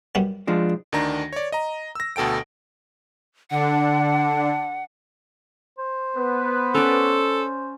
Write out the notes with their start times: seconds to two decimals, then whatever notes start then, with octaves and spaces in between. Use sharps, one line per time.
0.15 F#2 G3 B3
0.47 F3 G#3 D4
0.92 D2 D#3 D4 A#5 A#6
1.33 C#5 D5
1.52 D#5 A#5
1.95 E6 A#6
2.16 D2 B2 A4 G5 D7
3.51 D3 D4 F#5
5.78 C5
6.17 B3 B4
6.75 C#4 A4 D5